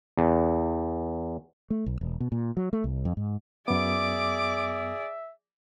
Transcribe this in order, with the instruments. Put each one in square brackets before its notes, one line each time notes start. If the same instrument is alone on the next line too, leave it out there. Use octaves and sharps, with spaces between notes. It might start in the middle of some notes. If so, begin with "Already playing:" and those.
[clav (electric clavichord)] E2
[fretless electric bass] A3
B1
E1
B2
A#2
F#3
A3
C2
F2
G#2
[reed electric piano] F#2 B3 [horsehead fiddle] G#4 D5 [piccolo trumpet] E5 [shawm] D6